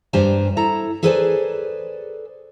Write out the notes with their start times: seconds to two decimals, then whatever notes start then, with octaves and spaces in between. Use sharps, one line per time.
0.13 G2 D4 G4 C5 G#5 A#5
0.57 E4 A4 A#5
1.03 G#4 A4 B4 C5 D5 G#5